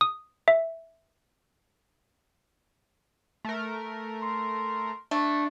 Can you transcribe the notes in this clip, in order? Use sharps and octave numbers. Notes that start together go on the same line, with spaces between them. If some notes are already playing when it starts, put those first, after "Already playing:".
D#6
E5
A3 A#4
C6
A3 D4